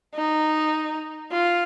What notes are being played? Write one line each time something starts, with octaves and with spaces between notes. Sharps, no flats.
D#4
F4